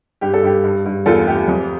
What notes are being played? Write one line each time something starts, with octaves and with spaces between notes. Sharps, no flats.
G2 G4
A4
G2 G4
G2
G2
E2 F4 A4
A3 G4
F2